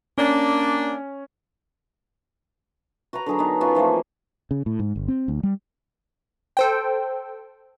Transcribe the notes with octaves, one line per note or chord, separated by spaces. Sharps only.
A#3 C#4 D4
F#4 B4 C#5 A#5
D3 F#3 G#4 A#4
B3 D#4
B3 C#4 F4 F#4
E3 F3 A3 A#3
C#3
A2
G#2
G1
C4
D2
G3
A4 C5 G5